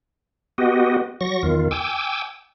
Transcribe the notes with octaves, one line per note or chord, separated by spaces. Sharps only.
B3 F#4 G4 D#5
F#3 C#6 A#6
E2 D#3 F4
G5 G#5 D6 E6